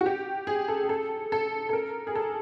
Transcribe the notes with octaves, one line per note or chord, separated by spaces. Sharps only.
F#4
G4
G#4
A4
G#4
A4
A4
A4
A#4
G#4
A4